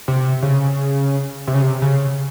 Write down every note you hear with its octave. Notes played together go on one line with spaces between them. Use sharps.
C3
C#3
C3
C#3
C3
C#3